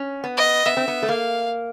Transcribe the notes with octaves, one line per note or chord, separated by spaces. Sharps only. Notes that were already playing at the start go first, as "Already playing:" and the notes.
Already playing: C#4
B3
D#5
B3 E5
C4
B3
A3
A#3 F5